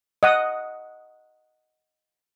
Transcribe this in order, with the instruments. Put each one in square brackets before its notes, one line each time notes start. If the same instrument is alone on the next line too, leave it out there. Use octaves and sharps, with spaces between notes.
[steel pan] D#5 F#5 D#6